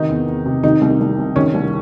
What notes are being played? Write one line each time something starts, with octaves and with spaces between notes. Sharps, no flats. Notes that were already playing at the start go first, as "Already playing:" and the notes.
Already playing: C3 D#3 D#4
E2
E2
C3
D#3 D#4
C2
C2
C3
D#3 C#4
C2